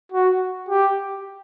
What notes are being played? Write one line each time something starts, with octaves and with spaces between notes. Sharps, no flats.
F#4
G4